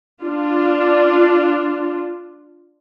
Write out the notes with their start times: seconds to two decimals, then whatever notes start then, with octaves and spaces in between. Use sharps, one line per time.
0.22 D4 F4